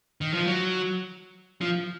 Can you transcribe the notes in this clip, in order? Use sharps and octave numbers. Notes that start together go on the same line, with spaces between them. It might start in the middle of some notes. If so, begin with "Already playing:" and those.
D#3
F3
F#3
F3